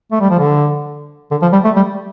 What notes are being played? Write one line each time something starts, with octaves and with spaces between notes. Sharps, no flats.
A3
G3
F3
D3
D3
F3
G3
A3
G3